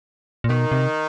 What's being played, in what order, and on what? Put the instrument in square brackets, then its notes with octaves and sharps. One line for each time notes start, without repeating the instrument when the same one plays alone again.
[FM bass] A#2
[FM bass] B2 [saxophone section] D#3
[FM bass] C3